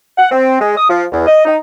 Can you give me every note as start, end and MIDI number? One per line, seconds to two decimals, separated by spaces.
0.17 0.27 78
0.31 0.60 60
0.60 0.76 56
0.76 0.88 87
0.89 1.04 53
1.12 1.25 40
1.27 1.44 75
1.45 1.56 63